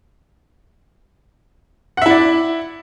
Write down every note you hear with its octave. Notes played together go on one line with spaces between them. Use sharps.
E4 D5 E5 F#5